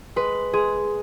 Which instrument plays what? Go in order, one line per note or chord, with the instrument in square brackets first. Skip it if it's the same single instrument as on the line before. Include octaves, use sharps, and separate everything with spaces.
[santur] G#3 [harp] B4
[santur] G#3 [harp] G#4